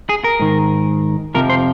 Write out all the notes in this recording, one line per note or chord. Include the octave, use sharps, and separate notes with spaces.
G#4
A#4
G#2 D#3
F2 C3 F3 A#4
C5